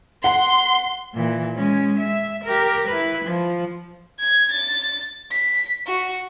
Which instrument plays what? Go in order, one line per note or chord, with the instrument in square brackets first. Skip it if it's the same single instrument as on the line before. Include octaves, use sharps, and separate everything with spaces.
[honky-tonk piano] F#5 [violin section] C6
[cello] A#2 E3
G#3 C#4
E5
G4 A#4
E4 B4
F3
[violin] G#6
A6
B6
F#4